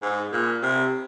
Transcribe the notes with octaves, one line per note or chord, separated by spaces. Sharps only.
G#2
A#2
C3